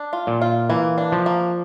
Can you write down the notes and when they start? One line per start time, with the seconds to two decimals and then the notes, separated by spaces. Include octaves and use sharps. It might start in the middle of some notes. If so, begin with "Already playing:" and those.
Already playing: D4
0.13 F4
0.27 A#2
0.42 F4
0.70 E3 A#3
0.98 D4
1.12 F3
1.26 A#3